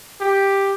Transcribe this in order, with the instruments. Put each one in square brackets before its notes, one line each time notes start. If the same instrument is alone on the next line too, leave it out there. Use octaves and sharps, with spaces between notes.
[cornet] G4